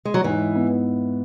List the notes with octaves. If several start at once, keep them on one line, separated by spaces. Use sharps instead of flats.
G#3
F#3
G#2 E3
B3